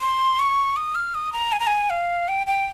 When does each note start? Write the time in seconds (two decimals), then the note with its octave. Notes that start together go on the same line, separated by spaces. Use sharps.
0.01 C6
0.39 C#6
0.76 D#6
0.95 F6
1.15 D#6
1.33 A#5
1.52 G#5
1.60 A#5
1.67 G#5
1.90 F5
2.28 G5
2.47 G5